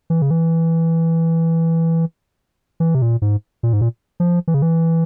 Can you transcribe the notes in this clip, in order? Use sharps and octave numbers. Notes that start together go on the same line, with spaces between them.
E3
C#3
E3
E3
C3
A#2
G#2
A#2
G#2
A#2
F3
E3
C#3
E3